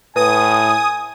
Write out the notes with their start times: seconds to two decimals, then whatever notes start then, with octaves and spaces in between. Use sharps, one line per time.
0.16 A2 B4 G#5 D#6